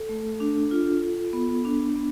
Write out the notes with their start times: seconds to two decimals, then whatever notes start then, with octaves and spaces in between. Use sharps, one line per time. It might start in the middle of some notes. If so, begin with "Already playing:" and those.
Already playing: A4
0.09 A3
0.40 D4
0.71 F4
1.02 F4
1.33 B3
1.65 D4
1.96 B3